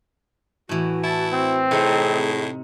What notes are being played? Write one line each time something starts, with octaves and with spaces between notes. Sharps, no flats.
A2 E3 F#4
E4 A5
C4
A2 C3 D#4 G#4